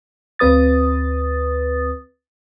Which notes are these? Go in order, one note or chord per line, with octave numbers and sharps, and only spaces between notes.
D2 C4 B4 D#6 A6